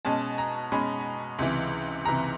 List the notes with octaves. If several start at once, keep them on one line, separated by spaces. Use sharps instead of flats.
B2 G#3 C#4 A5
A#5
B2 G#3 C#4 B5
C#2 C3 E3
C#2 C3 E3 A#5